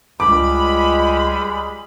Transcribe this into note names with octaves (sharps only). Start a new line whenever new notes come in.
C#2 G3 G#3 B5 D6